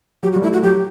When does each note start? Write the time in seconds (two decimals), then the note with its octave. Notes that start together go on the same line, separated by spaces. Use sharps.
0.23 F#3 G4
0.32 F#4
0.36 G3
0.42 A3 E4
0.53 F#4
0.63 F#3 G4